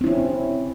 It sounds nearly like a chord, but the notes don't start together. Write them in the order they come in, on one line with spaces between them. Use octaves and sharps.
C4 E4 C#4